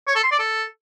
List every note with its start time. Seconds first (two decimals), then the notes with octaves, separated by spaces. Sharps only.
0.08 C#5
0.16 A4
0.24 C6
0.31 D5
0.39 A4